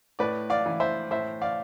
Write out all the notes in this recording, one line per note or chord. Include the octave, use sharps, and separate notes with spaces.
A2 B4 D5
D5 F5
E3
C5 E5
A2 C5 E5
D5 F5